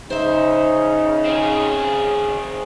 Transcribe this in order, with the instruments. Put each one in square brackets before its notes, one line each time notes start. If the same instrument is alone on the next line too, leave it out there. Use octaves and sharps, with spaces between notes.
[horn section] C#3 [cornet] D#4 [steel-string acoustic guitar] C5 E5
[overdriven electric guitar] C4 G#4